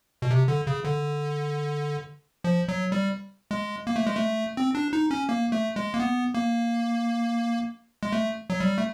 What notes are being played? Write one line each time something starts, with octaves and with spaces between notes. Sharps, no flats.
B2
C3
D3
C#3
D3
F3
F#3
G3
G#3
A#3
A3
G#3
A3
C4
D4
D#4
C#4
A#3
A3
G#3
A#3
B3
A#3
G#3
A3
F#3
G3
A3